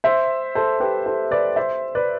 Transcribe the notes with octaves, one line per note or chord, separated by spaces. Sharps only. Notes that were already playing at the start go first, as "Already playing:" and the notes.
C5 E5
A4 C5
G4 B4
A4 C5
B4 D5
C5 E5
B4 D5